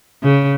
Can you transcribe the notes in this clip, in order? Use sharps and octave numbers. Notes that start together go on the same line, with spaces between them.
C#3